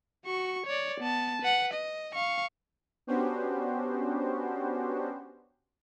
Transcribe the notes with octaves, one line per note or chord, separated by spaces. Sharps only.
F#4 C#6
C#5 D5
B3 A5
B4 F#5
D#5
F5 C#6
B3 C#4 D4 F#4 G4 C5